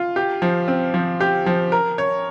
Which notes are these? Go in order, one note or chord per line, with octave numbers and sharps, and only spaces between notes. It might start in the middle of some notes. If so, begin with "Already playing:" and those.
Already playing: F4
G4
F3
C4
F3
G4
F3
A#4
C#5